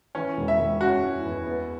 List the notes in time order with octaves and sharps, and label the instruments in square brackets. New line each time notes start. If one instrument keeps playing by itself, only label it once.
[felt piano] E3 [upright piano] C#4
[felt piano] E1
[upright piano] E5
[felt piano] E1
[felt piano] C#4 [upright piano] F#4
[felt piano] E4
E2
B3